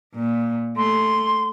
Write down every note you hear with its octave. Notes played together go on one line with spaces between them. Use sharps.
A#2
A3 C6